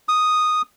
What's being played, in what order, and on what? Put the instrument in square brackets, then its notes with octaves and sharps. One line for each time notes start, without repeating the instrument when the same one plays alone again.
[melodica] D#6